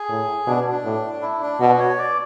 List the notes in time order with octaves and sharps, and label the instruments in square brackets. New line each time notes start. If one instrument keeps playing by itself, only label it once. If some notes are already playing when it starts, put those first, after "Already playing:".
Already playing: [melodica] G#4
[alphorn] A2
[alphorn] B2 [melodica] D4
[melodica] D4
[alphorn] A2
[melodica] E4
D4
[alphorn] B2 [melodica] F#4
[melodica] C#5
D5